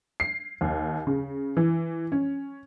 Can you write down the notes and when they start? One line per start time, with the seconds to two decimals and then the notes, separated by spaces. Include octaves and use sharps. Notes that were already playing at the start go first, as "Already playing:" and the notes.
0.20 C7
0.61 D#2
1.07 C#3
1.57 E3
2.12 C#4